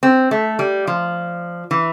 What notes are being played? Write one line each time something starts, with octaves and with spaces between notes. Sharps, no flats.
C4
A3
G3
F3
E3